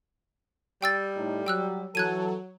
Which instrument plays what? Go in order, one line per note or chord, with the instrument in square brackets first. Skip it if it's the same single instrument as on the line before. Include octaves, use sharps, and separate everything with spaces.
[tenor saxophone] G3 [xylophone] G5 E6 A6
[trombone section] A2 D#4
[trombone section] F#3 [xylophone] G5 E6 F#6
[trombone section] E3 A4 [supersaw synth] F#3 [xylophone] F#6 G#6 D#7